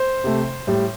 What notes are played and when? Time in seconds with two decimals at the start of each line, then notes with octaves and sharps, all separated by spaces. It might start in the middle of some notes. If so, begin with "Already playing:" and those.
Already playing: C5
0.24 C3 A3
0.67 A2 G3